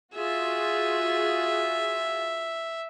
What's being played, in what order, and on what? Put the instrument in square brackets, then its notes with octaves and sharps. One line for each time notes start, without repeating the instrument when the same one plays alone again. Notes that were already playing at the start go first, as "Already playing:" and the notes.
[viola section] F4 F#4 G#4 [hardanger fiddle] E5